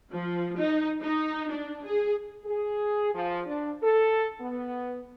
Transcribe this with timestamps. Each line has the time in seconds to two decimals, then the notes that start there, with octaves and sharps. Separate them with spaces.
0.12 F3
0.59 D#4
1.02 D#4
1.50 D4
1.85 G#4
2.45 G#4
3.13 F3
3.46 D4
3.82 A4
4.40 B3